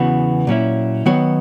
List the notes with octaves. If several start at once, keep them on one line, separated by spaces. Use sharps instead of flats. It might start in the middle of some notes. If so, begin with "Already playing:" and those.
Already playing: E2 C#3 E3 B3 F#4
A#2 F#3 C#4 E4
D#3 F#3 B3 F#4 C#5